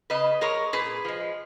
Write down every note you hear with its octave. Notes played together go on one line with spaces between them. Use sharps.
C#3 B4 D#5
G#3 A#4 C#5
A#2 G#4 B4
F3 G#3